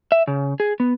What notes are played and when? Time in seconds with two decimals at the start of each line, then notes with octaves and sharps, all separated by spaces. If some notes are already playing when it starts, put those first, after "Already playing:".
0.12 E5
0.27 C#3
0.60 G#4
0.80 B3